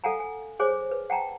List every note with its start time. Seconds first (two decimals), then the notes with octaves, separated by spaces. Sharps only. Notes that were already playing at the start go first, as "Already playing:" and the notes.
0.04 A4 F5 F#5 G#5 A#5
0.20 G#5
0.60 G#4 C5 C#5 G#5 D6
0.91 B4
1.10 F#5 G5 A5 A#5